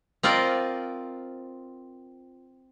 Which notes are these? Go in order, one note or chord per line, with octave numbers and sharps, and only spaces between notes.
C4 F4 A#4 D5 D#5